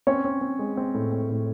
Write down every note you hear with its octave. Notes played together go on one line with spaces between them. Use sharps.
C4 C#4 C#5
C4
C4
G#3
C4
A2
C4
A2